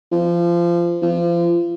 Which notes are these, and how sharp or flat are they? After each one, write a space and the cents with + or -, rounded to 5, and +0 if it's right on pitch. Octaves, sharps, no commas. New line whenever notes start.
F3 -25
F3 -30